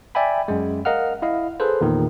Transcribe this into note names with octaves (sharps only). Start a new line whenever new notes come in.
D5 E5 G5 G#5 B5
F#2 G#3
A#4 D#5 F5 F#5 F6
E4 D#5 F5
G#4 A4 B4 C5
E2 A#2 D#3